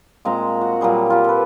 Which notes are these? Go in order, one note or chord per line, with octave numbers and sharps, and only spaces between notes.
A#2 G#3 C4 A#5
F#4 F#5
A#2 F#3 G3 G#4
F4 G4
A4 B4